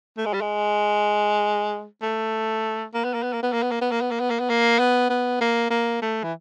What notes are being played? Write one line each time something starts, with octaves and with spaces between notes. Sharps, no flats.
A3
G#3
G3
G#3
A3
A#3
B3
A#3
B3
A#3
B3
A#3
B3
A#3
B3
A#3
B3
A#3
B3
A#3
B3
A#3
B3
B3
A#3
A#3
A3
E3